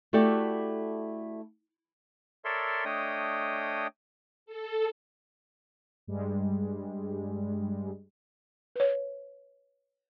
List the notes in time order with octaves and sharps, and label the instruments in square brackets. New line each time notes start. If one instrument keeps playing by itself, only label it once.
[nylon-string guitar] A3 E4 F#4 G4 A4 D5
[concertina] A4 A#4 C#5 D5 E5 C6
A3 D4 C#5 D#5 G5 D#6
[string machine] A4
[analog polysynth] G2 G3 G#3
[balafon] B4 C#5